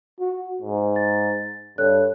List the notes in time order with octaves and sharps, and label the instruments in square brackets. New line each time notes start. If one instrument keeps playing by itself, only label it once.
[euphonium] F#4
G#2
[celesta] A6
[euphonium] G2 [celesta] A4 C#5 F#6